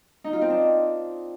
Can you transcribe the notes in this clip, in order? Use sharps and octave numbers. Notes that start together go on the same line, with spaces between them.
D#4
F4
C4
D4